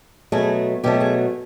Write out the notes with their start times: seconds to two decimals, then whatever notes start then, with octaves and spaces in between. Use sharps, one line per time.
0.32 B2 F#3 A3 G#4
0.84 B2 F#3 A3 G4
1.00 G#4